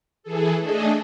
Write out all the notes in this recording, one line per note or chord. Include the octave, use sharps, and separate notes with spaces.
E3 G#4 A4
A3 D4 G#4 A4 D#5